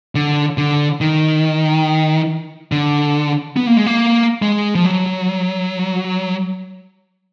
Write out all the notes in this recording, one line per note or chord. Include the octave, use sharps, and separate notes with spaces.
D3
D3
D#3
D3
B3
A#3
G#3
A#3
G#3
F3
F#3